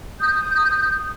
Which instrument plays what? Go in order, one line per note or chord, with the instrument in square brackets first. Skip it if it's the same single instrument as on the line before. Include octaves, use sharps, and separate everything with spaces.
[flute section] D#6 G6